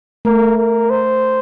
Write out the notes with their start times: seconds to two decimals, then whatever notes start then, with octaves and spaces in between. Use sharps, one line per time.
0.25 A3 A#4
0.58 A#4
0.90 C5